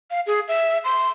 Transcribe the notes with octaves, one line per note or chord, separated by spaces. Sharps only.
F5
G#4
E5
C6